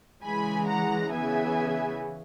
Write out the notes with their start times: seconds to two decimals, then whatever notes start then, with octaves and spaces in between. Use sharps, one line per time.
0.24 C#3 E3 G#3 G#5 B5
0.68 F#5 A#5
1.12 C#3 E3 B3 E5 G#5